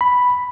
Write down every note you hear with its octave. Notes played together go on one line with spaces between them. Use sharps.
B5